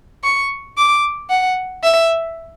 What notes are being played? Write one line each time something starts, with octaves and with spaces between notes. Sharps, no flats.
C#6
D6
F#5
E5